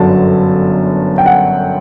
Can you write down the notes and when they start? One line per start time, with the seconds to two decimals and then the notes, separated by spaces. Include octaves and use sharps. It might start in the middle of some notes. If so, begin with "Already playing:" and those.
Already playing: G1 F#2 D3 F#3 A5
1.18 G5
1.26 F#5